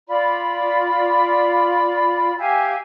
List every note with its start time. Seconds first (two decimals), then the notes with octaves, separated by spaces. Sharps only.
0.07 F4 D5 B5
2.38 G4 E5 F5 G#5